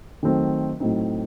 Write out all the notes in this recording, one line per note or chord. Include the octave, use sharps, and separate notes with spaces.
D#3 F#3 A3 C4
A2 F#3 C4 D#4